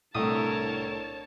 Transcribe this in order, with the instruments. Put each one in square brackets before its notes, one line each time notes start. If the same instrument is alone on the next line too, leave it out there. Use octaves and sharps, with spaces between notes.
[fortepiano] C2 [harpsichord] A2 A3 D#6 [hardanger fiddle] D4 A#4 [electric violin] C#5 A5